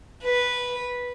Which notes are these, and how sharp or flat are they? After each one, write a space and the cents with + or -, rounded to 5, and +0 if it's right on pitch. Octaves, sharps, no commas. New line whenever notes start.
B4 -10